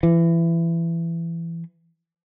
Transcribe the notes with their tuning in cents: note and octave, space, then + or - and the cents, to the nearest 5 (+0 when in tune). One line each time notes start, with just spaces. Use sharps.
E3 +20